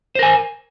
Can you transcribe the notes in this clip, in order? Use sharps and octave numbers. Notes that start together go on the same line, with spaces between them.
A#4 C5 G#5